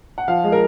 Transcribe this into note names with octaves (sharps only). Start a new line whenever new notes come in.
F#5
F3 F5
G#3
A#4